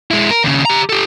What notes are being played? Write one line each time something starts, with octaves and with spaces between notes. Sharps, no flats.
G#3 E4
A#4
D#2 C#3
G4 A#5
G4 A4